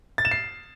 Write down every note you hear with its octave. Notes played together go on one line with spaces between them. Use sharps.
A6
E7
C7